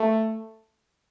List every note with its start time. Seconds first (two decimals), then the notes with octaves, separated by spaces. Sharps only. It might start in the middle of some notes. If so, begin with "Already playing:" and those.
Already playing: A3